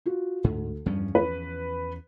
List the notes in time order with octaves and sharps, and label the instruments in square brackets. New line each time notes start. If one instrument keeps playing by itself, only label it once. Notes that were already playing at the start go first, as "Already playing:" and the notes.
[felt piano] F4 F#4
[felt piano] D2 [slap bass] G#2
[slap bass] E2 F3 C#4 [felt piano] G2
[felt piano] B4